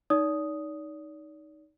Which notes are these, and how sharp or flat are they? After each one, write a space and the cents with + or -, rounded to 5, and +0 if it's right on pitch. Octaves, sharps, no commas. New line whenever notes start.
D#4 +0 D5 -40 D#6 +0